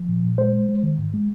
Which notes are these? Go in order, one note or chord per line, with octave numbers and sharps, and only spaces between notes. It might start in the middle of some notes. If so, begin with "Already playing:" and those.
Already playing: F3
A#2
A#2
G#3 C5
G#3
G#3
D#3
G#2
G#3